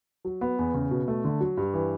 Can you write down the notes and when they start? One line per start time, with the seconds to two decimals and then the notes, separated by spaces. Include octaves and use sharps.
0.25 F#3
0.41 B3
0.59 E2
0.74 C#3
0.91 B2
1.08 A3
1.25 D3
1.40 F#3
1.57 G2
1.74 E3